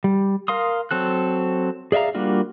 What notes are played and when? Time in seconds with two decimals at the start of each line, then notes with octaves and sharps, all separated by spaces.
0.04 G3
0.48 A#4 F5 C6 D#6
0.91 F#3 C4 A4 F#6
1.92 G#4 D5 E5 F5 A#5
2.15 G3 A#3 D4 F4 F#4